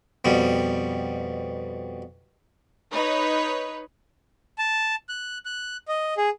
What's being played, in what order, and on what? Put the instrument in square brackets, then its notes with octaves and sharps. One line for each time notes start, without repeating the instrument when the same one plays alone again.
[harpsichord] F2 B2 G3
[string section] D#4 B4 C#5
[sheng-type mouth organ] A5
F#6
F#6
D#5
G#4